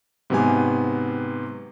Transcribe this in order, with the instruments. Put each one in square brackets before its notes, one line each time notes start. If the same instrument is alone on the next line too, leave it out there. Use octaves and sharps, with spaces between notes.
[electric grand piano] G#2 C3 F#3 B3 G4 G#5